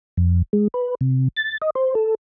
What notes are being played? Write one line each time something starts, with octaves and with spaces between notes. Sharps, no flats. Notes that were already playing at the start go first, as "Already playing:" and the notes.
F2
G#3
B4
C3
A6
D#5
C5
A4